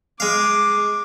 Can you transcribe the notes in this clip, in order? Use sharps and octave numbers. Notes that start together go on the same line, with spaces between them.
G#3 F5 D6